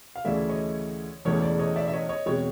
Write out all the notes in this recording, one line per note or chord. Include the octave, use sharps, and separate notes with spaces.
F5
D2 C#3 E3 A3 D5 E5
C#5 D#5
E1 E2 C#3 E3 A3 C#5
D5
C#5 D#5
D5 E5
E5
C#5 D#5
C#5 D#5
E2 B2 G#3 C4 C#5